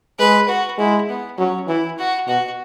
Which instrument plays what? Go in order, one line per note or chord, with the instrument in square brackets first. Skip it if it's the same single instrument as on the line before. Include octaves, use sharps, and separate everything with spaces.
[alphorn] G#3 [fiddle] B4
[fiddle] F#4
[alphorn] G#3 [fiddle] E4
[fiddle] B3
[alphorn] F#3 [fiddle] C#4
[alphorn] E3 [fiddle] E4
[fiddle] F#4
[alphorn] B2 [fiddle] F#4